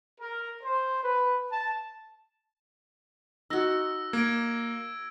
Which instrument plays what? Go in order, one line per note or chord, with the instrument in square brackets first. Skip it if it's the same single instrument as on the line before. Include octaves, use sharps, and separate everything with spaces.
[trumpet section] A#4
C5
B4
A5
[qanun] D#4 F#4 [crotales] E6 A#6 G7
[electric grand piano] A#3 [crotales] G#6 D7